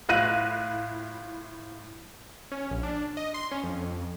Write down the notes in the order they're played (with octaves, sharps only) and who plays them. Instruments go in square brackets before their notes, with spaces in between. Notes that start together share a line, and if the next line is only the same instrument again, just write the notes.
[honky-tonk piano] A2 E4 F4 F#6 A#6 D#7
[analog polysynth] C#4
A#1
D4
D#5
C6
C#4
F2